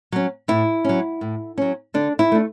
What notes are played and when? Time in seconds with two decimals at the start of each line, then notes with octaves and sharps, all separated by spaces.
0.12 F#3 C#4
0.48 A2 E4
0.84 F#3 C#4
1.21 A2
1.58 F#3 C#4
1.94 D3 D4
2.19 E4
2.32 A3 D4